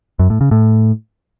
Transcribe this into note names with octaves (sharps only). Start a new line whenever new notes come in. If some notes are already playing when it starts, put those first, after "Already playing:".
F#2
A2
C#3
A2